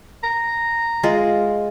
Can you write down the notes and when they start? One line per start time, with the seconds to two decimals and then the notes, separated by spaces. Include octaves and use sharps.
0.24 A#5
1.03 G#3 F4